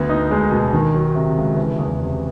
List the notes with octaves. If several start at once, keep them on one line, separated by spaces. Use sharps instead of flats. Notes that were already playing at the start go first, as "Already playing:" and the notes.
Already playing: D2 B3
D#4
G#3
B2
D#3
F#3
C3
C#2
E3
E2
C3